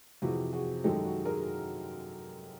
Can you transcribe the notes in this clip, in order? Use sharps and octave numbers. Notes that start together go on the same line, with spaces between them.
F2 C3 E3 F#4 G#4
F#4 G#4
F#2 D#3 G#3 G4 A4
F#4 G#4
G#4 A#4